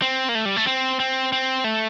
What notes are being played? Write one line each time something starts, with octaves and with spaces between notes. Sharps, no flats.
C4
A#3
A3
G3
A3
C4
C4
C4
A3